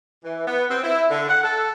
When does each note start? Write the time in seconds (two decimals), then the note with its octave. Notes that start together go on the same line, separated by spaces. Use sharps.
0.24 E3
0.46 B3
0.69 C4
0.83 E4
1.10 D3
1.28 F#5
1.43 A4